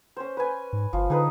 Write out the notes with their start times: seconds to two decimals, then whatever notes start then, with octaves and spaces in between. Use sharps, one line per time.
0.17 C#4 C5
0.37 B4 G#5
0.73 G#2
0.93 G1 F3
1.10 D3 D#4 G#4 B4